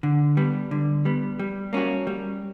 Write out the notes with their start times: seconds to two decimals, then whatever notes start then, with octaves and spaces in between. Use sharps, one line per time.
0.03 D3
0.37 G3 B3
0.71 D3
1.05 G3 B3
1.39 G3
1.73 A#3 C#4 F#4
2.07 G3